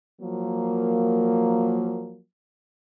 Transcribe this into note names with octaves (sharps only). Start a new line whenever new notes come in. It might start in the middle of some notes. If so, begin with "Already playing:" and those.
F3 F#3 A#3